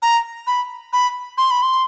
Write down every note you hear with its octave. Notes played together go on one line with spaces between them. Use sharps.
A#5
B5
B5
C6
B5
C6